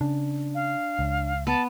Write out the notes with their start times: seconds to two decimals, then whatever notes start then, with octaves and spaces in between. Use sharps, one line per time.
0.01 C#3 D4
0.55 F5
0.99 C#2
1.47 B3 A5